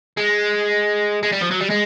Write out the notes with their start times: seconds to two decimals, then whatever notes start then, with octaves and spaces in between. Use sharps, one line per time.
0.17 G#3
1.23 G#3
1.33 G3
1.42 F3
1.51 F#3
1.61 G3
1.70 G#3